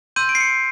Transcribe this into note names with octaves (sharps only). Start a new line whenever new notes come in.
C6 E6 G6 D#7
D7
C7
C#7